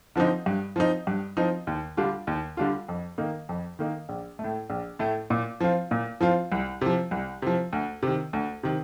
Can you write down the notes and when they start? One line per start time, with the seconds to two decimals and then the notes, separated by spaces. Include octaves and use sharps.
0.16 D3 F3 C4 D#4
0.46 G2
0.76 F3 C4 D#4
1.07 G2
1.37 F3 C4 D#4
1.67 D#2
1.97 D3 G3 D4 F4
2.27 D#2
2.57 D3 G3 D4 F4
2.89 F2
3.18 D#3 A#3 D#4
3.49 F2
3.79 D#3 A#3 D#4
4.09 A#1
4.39 A3
4.44 A2
4.70 A#1
4.99 A2 A3
5.30 A#2
5.60 F3 C4 F4
5.91 A#2
6.21 F3 C4 F4
6.52 C2
6.81 C3 F3
7.11 C2
7.42 C3 F3
7.73 D2
8.03 C3 D#3
8.33 D2
8.63 C3 D#3